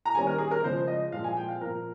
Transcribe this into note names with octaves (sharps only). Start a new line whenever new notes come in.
A#5
D#3 G3 A#3 C#4 G#5
A#4
G#4
A#4
C#3 F3 G#3 C5
D#5
A#2 F3 G#3 C4 F5
G#5
G5
F5
A#2 F3 C4 A#4